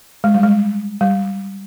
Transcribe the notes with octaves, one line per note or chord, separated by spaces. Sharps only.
G#3
G3
G#3
G3